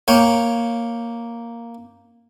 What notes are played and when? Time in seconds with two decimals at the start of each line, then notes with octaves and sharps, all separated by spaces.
0.08 A#3 C#5 G5